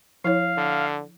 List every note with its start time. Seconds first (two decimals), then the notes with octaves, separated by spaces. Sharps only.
0.24 F3 E4 C#5 F5
0.57 D3